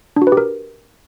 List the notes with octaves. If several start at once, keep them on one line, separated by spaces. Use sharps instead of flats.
D4
F#4
B4
G4
A#4